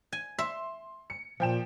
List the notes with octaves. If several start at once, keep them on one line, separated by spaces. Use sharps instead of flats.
G#5
E5 C6
C#7
A#2 F3 G5 E7